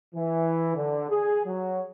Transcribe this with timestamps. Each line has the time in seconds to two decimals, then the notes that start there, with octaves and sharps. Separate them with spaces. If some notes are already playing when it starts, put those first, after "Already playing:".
0.15 E3
0.75 D3
1.09 G#4
1.45 F#3